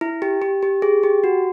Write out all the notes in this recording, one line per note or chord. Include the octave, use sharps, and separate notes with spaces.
E4
G4
G4
G4
G#4
G4
F#4